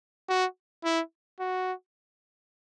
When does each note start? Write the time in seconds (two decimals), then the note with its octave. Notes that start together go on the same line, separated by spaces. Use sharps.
0.29 F#4
0.84 E4
1.40 F#4